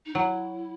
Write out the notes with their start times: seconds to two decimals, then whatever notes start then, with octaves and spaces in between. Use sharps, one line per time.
0.06 D#4
0.15 F#3 E4